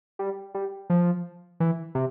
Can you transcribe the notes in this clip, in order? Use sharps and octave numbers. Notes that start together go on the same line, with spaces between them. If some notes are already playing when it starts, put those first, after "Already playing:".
G3
G3
F3
E3
C3